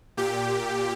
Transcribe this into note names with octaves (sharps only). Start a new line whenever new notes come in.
A#2 G4